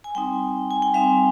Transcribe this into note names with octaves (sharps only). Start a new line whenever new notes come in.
G#5
G3 C4 D#4 G5
G#5
G5
G3 C4 D#4 F5